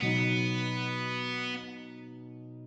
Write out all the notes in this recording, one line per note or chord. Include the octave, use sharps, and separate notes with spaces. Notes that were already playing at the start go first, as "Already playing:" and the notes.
B2 F#3 B3 D#4